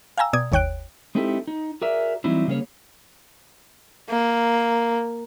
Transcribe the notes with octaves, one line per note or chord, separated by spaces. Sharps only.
F5 G5 G#5 A#5 E6
B2 D5 D#6 G#6
G1 D#2 C#5 G5 F#6 D7
G#3 C4 D#4 E4 G4 A4
D#4
F#4 G#4 A#4 D5 E5
E3 F#3 G3 C4 D#4 E4
C#3 G3 A#3 C#4 G#4 C#5
A#3